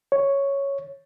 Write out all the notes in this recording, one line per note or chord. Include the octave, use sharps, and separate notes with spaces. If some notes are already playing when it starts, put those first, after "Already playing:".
C#5